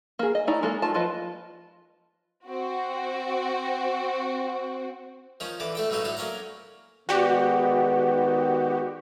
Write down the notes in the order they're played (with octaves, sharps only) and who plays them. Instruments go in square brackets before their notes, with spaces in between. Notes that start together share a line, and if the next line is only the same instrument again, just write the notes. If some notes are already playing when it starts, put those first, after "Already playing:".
[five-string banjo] A#3 G#4
D#5
A3 D#4 E4 D5 A#5
G#3 A#3 G#4 A4
A3 F4 A5
F3 F4 B4 D#5
[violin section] C4 F#4
[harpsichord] D#3 F3 C#4
D3 E3 D6
A3 A4 G5
B1 A2 F#3 A3 D#4 F#4
D2 A2 F#3 A4 D#6
F#3 A#3 C#4 F5 A#5
[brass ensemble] D#3 G#3 B3 [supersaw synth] F#4 G4 [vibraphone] D5 F#5